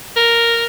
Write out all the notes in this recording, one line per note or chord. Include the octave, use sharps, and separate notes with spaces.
A#4